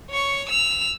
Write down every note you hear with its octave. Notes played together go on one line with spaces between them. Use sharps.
C#5 C#6
E6 F7